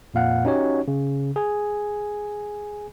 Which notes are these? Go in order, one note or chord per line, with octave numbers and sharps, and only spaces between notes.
F2 A#2 F5 F#5
C#4 D#4 F#4 G4 C#5
C#3
G#4 G#5